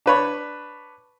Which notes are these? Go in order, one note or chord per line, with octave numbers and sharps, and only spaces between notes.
D4 B4 C#5